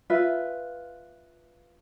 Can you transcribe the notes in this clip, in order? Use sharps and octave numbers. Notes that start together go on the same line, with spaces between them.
F4 B4 E5